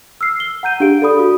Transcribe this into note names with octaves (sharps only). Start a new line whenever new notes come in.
E6 F6 C7
G7
F#5 A#5 G6 D#7
D4 G4 G#4 F5 D7
A4 D5 B5 D#6
F#4